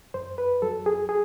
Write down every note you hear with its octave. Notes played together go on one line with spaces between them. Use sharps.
F#2 C5
B4
F#3 A4
G#4
G#4